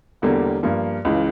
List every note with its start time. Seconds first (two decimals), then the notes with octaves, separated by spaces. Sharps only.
0.22 E1 E2 D3 G3 A#3
0.63 G2 F3 A#3
1.05 C#2 C#3 E3